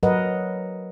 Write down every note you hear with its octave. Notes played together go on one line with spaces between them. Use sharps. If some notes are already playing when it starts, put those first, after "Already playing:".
F#3 A#4 B4 D#5 F#5